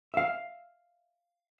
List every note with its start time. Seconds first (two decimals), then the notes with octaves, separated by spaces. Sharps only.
0.14 E5 F5